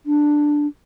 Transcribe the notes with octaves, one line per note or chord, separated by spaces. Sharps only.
D4